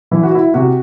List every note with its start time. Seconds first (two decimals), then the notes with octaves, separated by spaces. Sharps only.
0.11 E3 E4
0.23 F#4
0.35 E4
0.54 C3 F#4